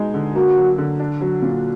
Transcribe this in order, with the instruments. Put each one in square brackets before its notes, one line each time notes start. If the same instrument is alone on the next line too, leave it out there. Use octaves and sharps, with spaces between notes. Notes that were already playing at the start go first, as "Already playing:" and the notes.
Already playing: [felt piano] B2 G#3 D#4
D3
[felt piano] A#3 [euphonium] F#4
[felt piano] F#3
D3
D4
F#3
A#2